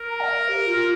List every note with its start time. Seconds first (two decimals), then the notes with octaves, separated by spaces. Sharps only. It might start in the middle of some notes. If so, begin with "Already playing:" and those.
Already playing: A#4
0.09 A#5
0.20 D5
0.27 F5
0.48 G4
0.66 F4